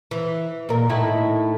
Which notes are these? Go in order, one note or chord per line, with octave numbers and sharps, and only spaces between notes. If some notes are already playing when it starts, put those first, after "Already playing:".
E3
A#2 A#4
A2 D#3 E4